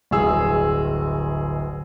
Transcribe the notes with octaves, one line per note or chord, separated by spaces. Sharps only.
D1 G1 G#4 E6